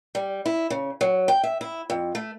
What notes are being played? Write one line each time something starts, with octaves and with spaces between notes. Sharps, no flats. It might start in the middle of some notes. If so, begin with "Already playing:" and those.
G3
E4
C#3
F#3
G5
E5
E4
F2
A3